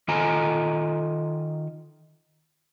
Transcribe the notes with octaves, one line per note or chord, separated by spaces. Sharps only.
D#3 F4 A4 D#5 G#5 A#5